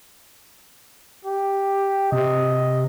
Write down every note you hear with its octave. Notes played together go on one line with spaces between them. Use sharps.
G4
C3 D#5